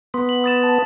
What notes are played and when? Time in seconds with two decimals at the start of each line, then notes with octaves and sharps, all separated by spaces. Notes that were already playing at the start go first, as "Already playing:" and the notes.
0.14 B3 C6
0.29 F#7
0.44 D#6 A6 E7
0.62 A5 A6